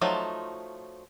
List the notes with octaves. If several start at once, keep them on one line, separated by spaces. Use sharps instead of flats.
F3 F#3 A3 D#4 F4